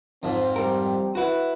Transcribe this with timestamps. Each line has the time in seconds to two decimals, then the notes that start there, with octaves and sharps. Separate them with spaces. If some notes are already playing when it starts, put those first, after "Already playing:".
0.23 F2 G#2 F3 C4
0.56 G3 A#4
1.15 E4 F#4 B4 F#5